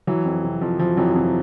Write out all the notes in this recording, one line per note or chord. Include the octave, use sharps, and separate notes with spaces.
E3 F#3
F2
C3
F2 F3
E3 F3
F2 E3 F#3
C3